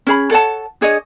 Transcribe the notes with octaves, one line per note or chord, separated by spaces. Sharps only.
C#4 G#4 B5
A4 C#5 F#5 A5
D4 G#4 C#5 D#5